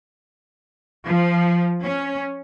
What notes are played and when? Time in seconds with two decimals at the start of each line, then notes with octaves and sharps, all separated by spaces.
1.06 F3
1.82 C#4